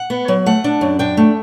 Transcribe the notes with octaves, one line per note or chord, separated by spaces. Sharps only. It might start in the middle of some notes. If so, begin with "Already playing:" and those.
Already playing: F#5
B3
F#3
A3 F#5
D4
F#2
D4 G5
A3